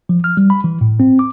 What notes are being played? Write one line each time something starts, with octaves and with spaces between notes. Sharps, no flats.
F3
F6
G3
B5
E3
A2
C4
D6